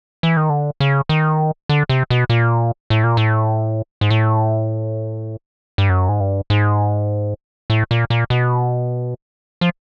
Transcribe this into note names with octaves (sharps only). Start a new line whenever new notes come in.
E3
D#3
D3
C#3
D#3
D3
C3
B2
A#2
A2
A#2
A2
G#2
A2
G2
F#2
G#2
G2
G#2
A2
A#2
A#2
B2
F3